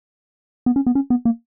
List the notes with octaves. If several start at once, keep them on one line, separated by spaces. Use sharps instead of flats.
B3
C#4
B3
C#4
B3
A#3